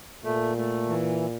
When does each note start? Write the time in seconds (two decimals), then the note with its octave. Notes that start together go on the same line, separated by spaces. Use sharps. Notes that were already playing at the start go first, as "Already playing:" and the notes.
0.25 A#2 A3
0.57 A3
0.89 E3